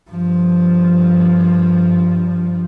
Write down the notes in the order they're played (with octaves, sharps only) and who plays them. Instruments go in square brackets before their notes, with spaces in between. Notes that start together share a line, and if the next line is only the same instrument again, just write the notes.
[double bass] G2 F3